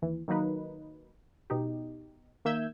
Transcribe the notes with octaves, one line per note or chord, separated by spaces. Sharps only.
D#2 E3
D#3 F#3 A#3 D#4 B4
B2 D#4 G4
D#3 A#3 E5 E6 G6 G#6